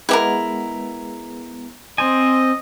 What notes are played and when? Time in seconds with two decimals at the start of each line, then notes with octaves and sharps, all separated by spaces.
0.09 G#3 B3 E4 G4 A#4
1.98 C4 C5 D#5 G#5